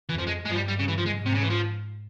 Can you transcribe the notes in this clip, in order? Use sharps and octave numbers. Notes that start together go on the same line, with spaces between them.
F2 E3
F3
G#3
G2 F3 G#3
G3
G3
C#3
E3
F3
G#3
G#2
C3
C#3
E3
F3